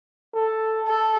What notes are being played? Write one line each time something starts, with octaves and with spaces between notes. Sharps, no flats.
A4
A4